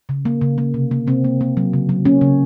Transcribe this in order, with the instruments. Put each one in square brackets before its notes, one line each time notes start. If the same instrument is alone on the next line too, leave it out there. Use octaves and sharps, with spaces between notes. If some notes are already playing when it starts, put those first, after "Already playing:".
[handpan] C#3
A#3
C#3
A#3
C3
A#3
C3 C4
A#3
A#3
F#3
C#3
F#3
A#3 C#4
C#3